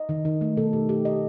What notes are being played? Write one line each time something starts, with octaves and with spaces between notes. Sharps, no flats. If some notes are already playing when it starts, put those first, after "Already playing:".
Already playing: D#5
D#3
D#3
A3
B2 A4
B2 G4
B2 G4
A3 D#5